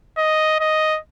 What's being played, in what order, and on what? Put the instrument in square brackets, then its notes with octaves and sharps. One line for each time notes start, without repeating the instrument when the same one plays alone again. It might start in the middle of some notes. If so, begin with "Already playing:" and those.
[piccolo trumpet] D#5
D#5